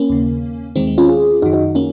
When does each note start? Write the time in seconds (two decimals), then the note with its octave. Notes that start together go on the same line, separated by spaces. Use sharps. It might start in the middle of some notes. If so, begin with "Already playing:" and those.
Already playing: A#3 C#4
0.10 D#2 C#3
0.76 D#3 G#3 C4
0.80 D#2
0.87 G#3
0.98 C#4 F4
1.09 F4 G#4
1.42 F#2 D#3 D#4 F#4
1.53 D#4 F#4
1.75 A#3 C#4